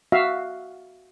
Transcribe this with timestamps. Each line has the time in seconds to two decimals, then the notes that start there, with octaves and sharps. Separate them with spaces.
0.12 F#4 E5 F5